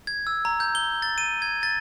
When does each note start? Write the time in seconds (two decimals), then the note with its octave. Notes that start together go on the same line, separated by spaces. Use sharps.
0.07 G#6
0.27 E6
0.45 A#5
0.60 G6
0.75 G7
1.02 A6
1.18 D#7
1.42 G#6
1.63 A6